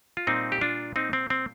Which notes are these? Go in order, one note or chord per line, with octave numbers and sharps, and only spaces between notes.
F4
A#2 G3 A#3 C4 D#4
G4
D4 F4
C4 D#4
C4
C4